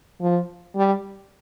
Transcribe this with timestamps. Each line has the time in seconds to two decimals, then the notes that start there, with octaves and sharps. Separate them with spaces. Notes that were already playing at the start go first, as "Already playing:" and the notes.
0.22 F3
0.76 G3